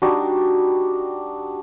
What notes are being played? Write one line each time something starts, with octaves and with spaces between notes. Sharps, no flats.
G3 D4 D#4 F#4